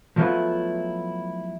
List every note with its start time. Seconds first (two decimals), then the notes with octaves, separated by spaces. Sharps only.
0.16 F3 F#3 A3 B3 E4 F4